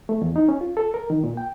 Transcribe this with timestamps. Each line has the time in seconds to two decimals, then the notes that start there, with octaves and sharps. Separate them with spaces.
0.09 A3
0.22 E2
0.36 D#4
0.49 C#4
0.61 F4
0.77 A4
0.94 A#4
1.10 D#3
1.24 A#2
1.37 G5